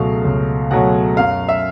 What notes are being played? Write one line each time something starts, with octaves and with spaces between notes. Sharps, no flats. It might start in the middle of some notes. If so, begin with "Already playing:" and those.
Already playing: C#2 B2 F#3 A3 F5
C#2
B2 F#3 A3 F#5
F#2 F5
E5